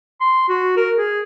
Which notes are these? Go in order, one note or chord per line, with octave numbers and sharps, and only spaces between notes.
C6
F#4
A#4
G#4